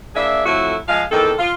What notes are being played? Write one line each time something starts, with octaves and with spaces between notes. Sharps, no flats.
A#3 D4 G#4 E5
F2 A2 A3 E4 F#4
F3 G#3 F5
E2 D#3 C4 A4
F4